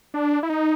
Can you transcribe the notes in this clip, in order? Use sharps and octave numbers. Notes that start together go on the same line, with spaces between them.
D4
E4
D#4